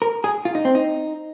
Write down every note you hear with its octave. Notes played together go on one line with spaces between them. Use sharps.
A#4
G#4
F4
D#4
C4
D#4